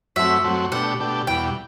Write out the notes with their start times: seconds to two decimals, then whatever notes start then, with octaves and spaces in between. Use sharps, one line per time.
0.16 F#2 F#3 A3 C4 E5
0.44 F#2 F#3 A3 C4
0.71 B2 A3 D4 G4 F#5
1.00 B2 A3 D4 G4
1.27 E2 B2 G3 G5